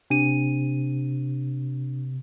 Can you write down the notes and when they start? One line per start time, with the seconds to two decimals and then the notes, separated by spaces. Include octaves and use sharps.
0.10 C3 D4 D#7